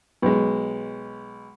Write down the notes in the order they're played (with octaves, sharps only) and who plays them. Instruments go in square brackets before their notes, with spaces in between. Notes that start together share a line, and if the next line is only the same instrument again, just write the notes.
[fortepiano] B1 G#3